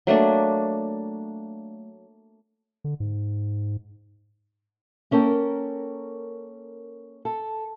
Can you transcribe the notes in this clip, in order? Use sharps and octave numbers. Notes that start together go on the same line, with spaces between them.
F#3 A3 A#3 D4
D3
G#2
A#3 C#4 A4 A#4 G5
A4